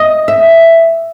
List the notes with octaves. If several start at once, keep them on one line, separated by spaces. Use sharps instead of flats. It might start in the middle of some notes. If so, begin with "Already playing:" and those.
Already playing: D#5
E5